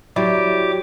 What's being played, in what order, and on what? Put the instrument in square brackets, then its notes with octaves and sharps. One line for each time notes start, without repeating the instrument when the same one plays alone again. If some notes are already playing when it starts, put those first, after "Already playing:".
[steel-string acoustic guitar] F#3 [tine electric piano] E4 D5 [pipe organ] G4 D6